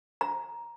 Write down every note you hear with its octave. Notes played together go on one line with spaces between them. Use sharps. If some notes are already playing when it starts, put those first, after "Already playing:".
A#5